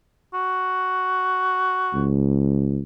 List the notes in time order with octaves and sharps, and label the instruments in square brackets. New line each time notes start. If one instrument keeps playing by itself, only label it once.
[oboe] F#4
[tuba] C#2